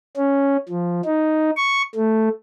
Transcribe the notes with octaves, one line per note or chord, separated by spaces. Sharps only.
C#4
F3
D#4
C#6
A3